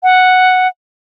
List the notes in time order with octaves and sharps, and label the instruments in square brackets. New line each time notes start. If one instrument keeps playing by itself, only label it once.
[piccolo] F#5